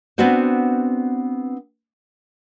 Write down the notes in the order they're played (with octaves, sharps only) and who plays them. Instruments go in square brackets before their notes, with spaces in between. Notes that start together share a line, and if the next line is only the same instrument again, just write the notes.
[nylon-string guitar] B3 C4 D4 F#4 B4 C5